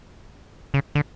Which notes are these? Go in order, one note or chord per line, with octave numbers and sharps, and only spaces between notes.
C#3
D3